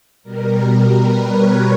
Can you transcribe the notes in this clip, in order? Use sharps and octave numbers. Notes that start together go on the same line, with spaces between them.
B2 G3 A#4
A#4
B4
C#5